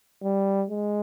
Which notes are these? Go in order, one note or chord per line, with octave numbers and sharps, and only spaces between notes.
G3
G#3